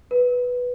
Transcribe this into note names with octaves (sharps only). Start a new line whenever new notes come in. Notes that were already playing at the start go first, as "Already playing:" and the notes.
B4